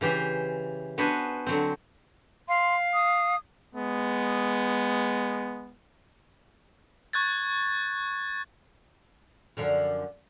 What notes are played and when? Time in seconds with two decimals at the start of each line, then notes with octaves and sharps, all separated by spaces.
0.01 C#3 E3 G4 C5 G#5
0.98 B3 D4 F#4 B4 C5 G#5
1.46 D3 F#3 C4
2.49 F5 C6
2.94 D#6
3.75 G#3 B3
7.13 C#6 F#6 G#6 A6
9.57 F#2 D3 F3